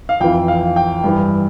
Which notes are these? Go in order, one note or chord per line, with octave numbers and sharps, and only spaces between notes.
F5
F2 E3 G5
F5
G5
G2 E3